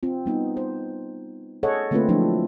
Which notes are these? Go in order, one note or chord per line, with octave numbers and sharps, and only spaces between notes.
C4 F4
G3 B3 D#4
C5
G#4 A4 C#5 D#5 F#5
D3 A3 A#3 C4 F4 B4
F3 F#3 A3 D4 E4